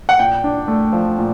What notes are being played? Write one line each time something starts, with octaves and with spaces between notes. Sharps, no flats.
F#5
A#2 G5
D4
A3
F3
A#2